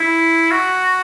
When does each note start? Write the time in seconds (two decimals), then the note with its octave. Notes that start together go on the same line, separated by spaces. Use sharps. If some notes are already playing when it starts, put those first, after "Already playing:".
Already playing: E4
0.51 F#4